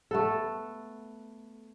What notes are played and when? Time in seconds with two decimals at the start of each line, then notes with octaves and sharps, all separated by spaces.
0.11 A3 B3 A4